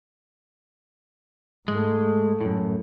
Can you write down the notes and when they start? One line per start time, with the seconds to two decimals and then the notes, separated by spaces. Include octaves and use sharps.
1.68 G#2 G#3 A3
2.41 F#2 A2